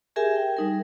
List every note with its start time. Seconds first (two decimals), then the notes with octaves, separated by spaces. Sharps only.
0.16 G4 G#4 A#4 E5 G#5
0.36 G5
0.57 G3 D#4 A#4